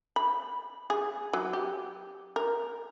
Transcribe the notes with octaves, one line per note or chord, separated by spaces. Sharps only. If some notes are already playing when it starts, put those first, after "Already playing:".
B5
G#4
F#3
G4
A#4